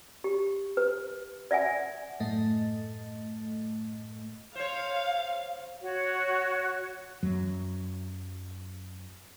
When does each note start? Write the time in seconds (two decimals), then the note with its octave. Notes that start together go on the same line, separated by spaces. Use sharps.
0.24 G4
0.77 B4
1.51 D5 E5 F#5 G#5
2.20 F#2 A2 A3 D#5
4.55 C5 C#5 F5
5.82 F#4 C#5
7.23 F#2 F#3